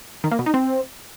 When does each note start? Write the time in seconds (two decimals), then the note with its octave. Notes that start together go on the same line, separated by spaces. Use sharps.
0.24 D#3
0.31 A#3
0.39 B2
0.46 D#4
0.54 C4